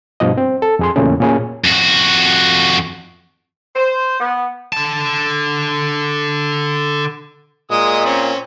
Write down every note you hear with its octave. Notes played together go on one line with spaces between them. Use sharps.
G2 B2 F3 D#5
C4
A4
F2 G#4 C6
E2 A#2 C#3 A3 C#4
A#2 C#4 G#4
F2 F#4
C5
B3
D3 A5
A#2 G#3 D#5 D#6
C4 C#4